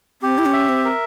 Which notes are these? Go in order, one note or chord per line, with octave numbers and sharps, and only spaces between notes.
C4 G4
E4
C#4
E5
C4
A#4